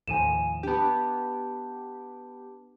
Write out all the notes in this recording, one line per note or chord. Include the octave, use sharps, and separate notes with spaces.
D#2 A2 F3 G#5 D#7 E7
B3 D4 G4 A5